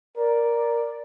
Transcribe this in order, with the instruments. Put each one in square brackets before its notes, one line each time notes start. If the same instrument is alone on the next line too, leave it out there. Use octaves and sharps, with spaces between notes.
[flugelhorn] A#4 [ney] D5